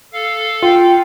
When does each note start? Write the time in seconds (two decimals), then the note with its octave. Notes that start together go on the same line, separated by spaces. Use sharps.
0.13 A4 F5
0.62 F4 G5